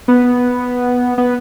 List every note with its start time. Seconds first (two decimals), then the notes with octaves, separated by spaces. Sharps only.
0.08 B3
1.18 B3